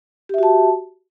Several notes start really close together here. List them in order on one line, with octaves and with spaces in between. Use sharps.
G4 E5 F#4 A5